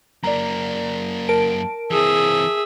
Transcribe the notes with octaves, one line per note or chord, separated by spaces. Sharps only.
F#2 A#3 D5 A#5
A#4 A5 D7
E3 C4 G#4 E5